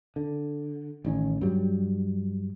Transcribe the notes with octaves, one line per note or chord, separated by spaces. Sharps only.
D3
A1 D#3 C#4
G2 F#3 G3